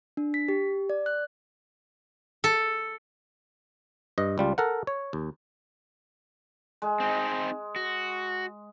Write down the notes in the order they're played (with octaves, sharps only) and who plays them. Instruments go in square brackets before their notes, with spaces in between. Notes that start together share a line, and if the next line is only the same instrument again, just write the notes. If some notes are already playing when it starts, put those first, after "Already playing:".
[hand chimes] D4
B6
G4
D5
F#6
[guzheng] A4
[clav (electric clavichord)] G2 D#5
C#2 G3 F4
A4 A#4 F#5
C#5
D#2
[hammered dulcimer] G#3
[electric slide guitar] C4 D#4
F#4